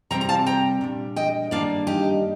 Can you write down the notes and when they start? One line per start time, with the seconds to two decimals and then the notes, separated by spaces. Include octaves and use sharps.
0.10 C3 G3 C4 G5 A#5
0.21 A#5
0.29 F5 A5
0.46 G5 A#5
0.81 A#2 G3 D4
1.16 D#5 G5
1.51 G2 D#3 G3 A#3 D4 D5 F5
1.87 D#4 G4